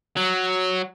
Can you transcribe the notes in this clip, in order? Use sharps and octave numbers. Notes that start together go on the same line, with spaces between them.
F#3